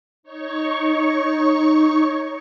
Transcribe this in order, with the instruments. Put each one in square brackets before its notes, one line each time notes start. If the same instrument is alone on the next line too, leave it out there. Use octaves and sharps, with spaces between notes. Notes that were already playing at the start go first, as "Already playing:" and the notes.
[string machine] D#4 C#5 C#6